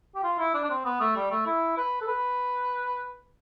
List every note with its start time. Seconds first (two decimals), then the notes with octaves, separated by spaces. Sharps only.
0.15 G4
0.24 F4
0.39 E4
0.54 D4
0.64 D4
0.70 C4
0.85 B3
1.00 A3
1.16 G3
1.31 A3
1.47 E4
1.77 B4
2.01 A4
2.08 B4